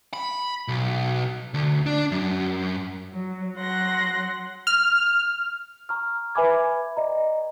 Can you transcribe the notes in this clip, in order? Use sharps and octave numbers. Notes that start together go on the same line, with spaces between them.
B5
B1
D2
D4
F#2
F#3
F#3 F#5 C6 A#6
F6
A#5 C#6 F6
B4 E5 G#5 B5 D6 G#6
D5 D#5 A#5